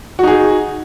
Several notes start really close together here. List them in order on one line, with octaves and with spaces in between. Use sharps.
F#4 D#4 G#4